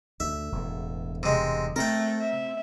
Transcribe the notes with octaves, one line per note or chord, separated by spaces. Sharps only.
D2 E5
E1 E2 A2
C3 G#3
A3 C4 A#4 G5
E5